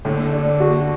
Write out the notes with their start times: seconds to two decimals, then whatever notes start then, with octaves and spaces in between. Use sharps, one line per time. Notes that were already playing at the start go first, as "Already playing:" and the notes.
0.05 A2 D3
0.33 D4
0.60 F#4